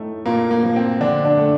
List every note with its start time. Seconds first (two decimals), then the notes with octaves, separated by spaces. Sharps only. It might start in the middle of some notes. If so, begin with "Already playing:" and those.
Already playing: A2 A3 D#4
0.26 A#2 A#3
0.51 A#3
0.63 F3 A#3
0.76 C4
1.00 D3 D4
1.25 D4
1.37 A3